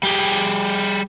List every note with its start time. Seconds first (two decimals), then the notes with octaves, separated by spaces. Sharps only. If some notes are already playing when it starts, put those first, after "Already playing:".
0.03 G3 G4 G#4